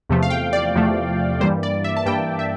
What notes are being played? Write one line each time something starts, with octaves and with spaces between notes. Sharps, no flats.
E2 C3 F3 A3
F5
G5
D5
E2 C3 F3 A3
G2 E3 G3 A#3 C5
D5
E5
A5
G2 E3 G3 A#3 G5
E5